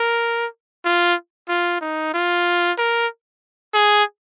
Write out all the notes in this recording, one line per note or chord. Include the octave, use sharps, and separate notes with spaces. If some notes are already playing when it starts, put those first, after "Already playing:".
Already playing: A#4
F4
F4
D#4
F4
A#4
G#4